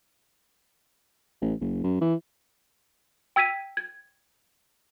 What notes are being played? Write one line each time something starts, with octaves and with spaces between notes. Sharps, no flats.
A1
F#1
F#2
E3
G5 E6 G#6 B6 D#7
G#6